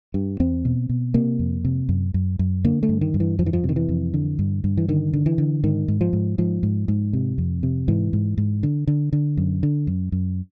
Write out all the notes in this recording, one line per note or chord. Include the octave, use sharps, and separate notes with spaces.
G2
E2 C4
B2
B2
C3 A#3
F2
C3
F#2
F#2
F#2
D3 A#3
A3
G2
D#3
G2
E3
F2 F3
E3
F3
C3
D#3
E3
F2
D3
G2
G2
E3
D3 D#3
D3
E3
D3
G#2 D#3
G#2
F3
G#2
G#2 F3
G#2
G#2
C3
F2
C3
G#2 E3
G#2
G#2
D3
D3
D3
F#2
D3
F#2
F#2